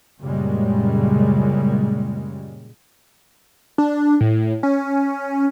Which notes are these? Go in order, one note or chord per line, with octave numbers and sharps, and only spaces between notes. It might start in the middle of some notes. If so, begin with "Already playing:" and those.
F#2 A#2 C#3 G3 G#3
D4
A2
C#4